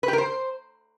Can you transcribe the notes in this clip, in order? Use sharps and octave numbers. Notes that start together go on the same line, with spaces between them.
B4
G4
A#4
C5